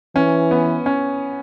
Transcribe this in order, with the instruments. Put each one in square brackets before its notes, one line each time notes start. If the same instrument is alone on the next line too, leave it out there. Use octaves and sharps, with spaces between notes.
[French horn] E3 [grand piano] C#4
[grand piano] B3
C#4